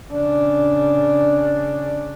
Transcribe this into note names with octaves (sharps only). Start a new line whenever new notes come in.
C#3 D4